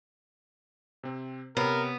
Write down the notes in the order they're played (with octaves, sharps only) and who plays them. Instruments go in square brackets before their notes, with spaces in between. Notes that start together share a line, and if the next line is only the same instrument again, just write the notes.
[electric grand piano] C3 C4
[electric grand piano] C3 C#5 C7 [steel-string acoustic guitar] B3 [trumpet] A#4